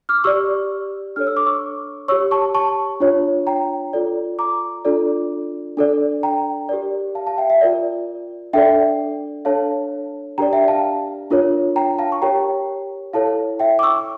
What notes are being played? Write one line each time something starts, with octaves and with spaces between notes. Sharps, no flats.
D6 F6
G4 D5 C#6 E6
D4 A4 C#5 F6
E6
D6
C#6 E6
G4 C#5 C#6 E6
A5 C#6
A5 C#6
D4 F4 C#5
G5 A#5
F4 A4 D5
A#5 D6
D4 F4 A4 D5
D4 A4 D5
G5 A#5
G4 A#4 D5
F5 A5
F5 A5
E5 G5
E5
F4 A#4 D5
D4 A4 D5 E5 G5
D4 A4 C#5 F5 A5
D4 G4 A#4 D5 G5 A#5
E5 G5
F5 A5
D4 F4 A#4 C#5
G5 A#5
F5 A5
C#6
G4 A#4 C#5 G5 A#5
E4 A4 C#5 F5 A5
E5 G5
D6
C#6 E6